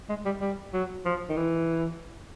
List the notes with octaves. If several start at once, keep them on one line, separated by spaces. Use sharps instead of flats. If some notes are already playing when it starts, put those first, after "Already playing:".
G#3
G3
G3
F#3
F3
D#3
E3